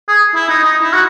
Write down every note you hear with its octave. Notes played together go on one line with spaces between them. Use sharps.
G#4
E4
D#4
D#4
E4
F#4